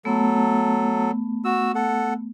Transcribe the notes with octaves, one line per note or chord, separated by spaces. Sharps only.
F#3 A3 B3 A4
F#4 E6
A4 F#5